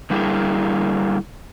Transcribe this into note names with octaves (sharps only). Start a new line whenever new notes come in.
D3 G3 A#3 E4 G#4